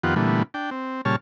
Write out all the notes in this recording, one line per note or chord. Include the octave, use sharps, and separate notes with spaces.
F2 D#3 B3 F4 G4 F#5
A#2 D3 E3 G3 A3 B3
D4 G5
C4
A#2 C#3 G3 C#5 A5 F6